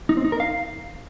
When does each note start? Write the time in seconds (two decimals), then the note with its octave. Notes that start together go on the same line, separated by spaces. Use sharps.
0.09 D#4
0.17 C4
0.25 D#4
0.32 A#4
0.40 F5